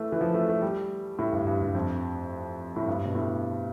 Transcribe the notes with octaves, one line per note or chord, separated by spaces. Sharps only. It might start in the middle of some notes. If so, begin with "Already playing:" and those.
Already playing: E3 A3
E3
F3
A3
A3
G3
A2
G2
G2
G2
F2
A2
G2
B2
A2